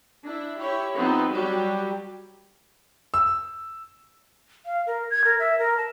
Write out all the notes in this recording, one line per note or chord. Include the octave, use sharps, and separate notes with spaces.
D4 E4
E4 G4 C#5
F3 B3 C4 D#4
F#3 G3 F#4 G4
E6
F5
A#4
G#6
A#4
E5
A#4
A5